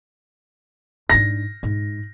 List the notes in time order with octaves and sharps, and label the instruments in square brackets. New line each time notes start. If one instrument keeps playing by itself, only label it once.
[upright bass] G#2 D4 [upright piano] A#6
[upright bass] G#2